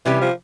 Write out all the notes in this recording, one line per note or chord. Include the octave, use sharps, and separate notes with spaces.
C3 E3 G3 C#4 G4
F3